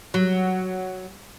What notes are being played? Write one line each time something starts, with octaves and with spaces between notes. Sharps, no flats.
F#3